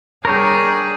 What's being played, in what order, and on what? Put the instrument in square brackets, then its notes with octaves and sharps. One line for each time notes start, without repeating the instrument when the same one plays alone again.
[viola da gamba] G3 D4 G#4 [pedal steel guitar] A#4 C#5 G5